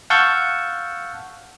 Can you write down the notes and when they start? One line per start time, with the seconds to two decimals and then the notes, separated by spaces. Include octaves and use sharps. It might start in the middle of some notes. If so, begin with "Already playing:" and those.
0.10 F5 F#5 A5 C#6 E6 G6